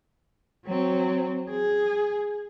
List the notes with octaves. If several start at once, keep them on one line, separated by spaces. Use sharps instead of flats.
F#3 C4
G#4